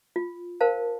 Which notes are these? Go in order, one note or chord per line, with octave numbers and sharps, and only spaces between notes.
F4
A#4 C5 F5 A5